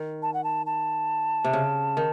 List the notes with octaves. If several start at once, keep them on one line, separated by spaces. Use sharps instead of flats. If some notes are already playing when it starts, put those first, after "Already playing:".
Already playing: D#3
A5
F#5
A5
A5
C3
C#3
D#3